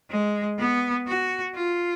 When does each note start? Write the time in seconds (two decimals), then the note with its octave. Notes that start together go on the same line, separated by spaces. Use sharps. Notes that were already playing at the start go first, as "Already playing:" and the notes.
0.10 G#3
0.59 B3
1.07 F#4
1.55 F4